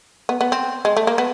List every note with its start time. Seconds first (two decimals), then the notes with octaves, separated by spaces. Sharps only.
0.29 B3
0.41 B3
0.52 C4
0.85 G#3
0.97 A3
1.07 A#3
1.18 B3